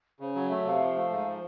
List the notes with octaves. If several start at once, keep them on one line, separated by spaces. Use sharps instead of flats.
C#3 C5
F#3 C#5
A3 E5
C3 F5
F3
A3
G#2
F3